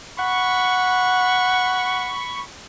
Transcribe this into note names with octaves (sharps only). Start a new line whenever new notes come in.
F#5 B5 C#6